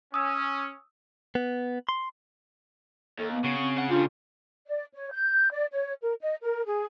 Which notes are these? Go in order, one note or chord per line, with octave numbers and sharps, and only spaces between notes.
C#4 D#6 E6
B3
C6
D#2 A4
B3
C#3 F#4
C4
F#5
G3 A3 D4 F4
D5
C#5
G6
D5
C#5
A#4
D#5
A#4
G#4